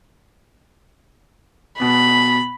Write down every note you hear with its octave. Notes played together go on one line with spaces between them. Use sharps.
B2 B3 B5